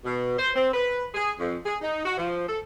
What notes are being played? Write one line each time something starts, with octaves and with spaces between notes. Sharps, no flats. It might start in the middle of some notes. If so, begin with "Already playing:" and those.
B2
C5
C4
B4
G#4
F2
G#4
D#4
F#4
F3
A4